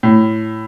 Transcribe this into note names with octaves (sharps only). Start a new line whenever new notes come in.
A2